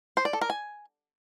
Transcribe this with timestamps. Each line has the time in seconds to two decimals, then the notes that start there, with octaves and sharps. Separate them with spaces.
0.17 C5
0.25 D5
0.33 A4
0.41 A#4
0.50 G#5